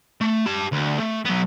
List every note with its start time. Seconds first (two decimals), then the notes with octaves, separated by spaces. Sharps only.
0.21 A3
0.46 G4 A5
0.72 D2
0.99 A3
1.25 F#3 B3